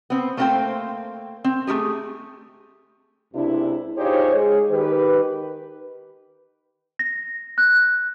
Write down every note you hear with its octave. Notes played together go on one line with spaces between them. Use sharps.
B3 C4
A3 A#3 C4 F4 C5 G5
C4
A3 E4 G4 G#4
C#2 C3 D4 E4
D#4 F4 G4 G#4 C5 C#5
G#3 G#4
D#3 G4 B4
A#6
F#6